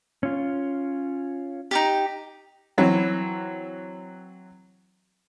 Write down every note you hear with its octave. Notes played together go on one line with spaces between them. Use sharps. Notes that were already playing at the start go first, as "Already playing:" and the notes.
C#4 F4
D#4 F4 G4
E3 F#3 C4